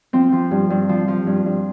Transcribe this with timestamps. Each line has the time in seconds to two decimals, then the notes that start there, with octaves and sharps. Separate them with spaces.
0.13 F3 C4
0.32 F3
0.51 G2
0.70 G2
0.89 F3
1.08 F3
1.27 G2
1.46 G2